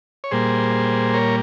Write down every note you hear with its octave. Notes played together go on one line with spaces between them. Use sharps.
C#5
A#2 G3 A#3 G#4 C5
A#4 C#5